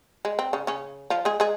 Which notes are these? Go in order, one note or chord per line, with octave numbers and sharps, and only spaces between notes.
G#3
C4
C#3 C#4
C#3 C#4
F3 F4
G#3 G#4
G#3 G#4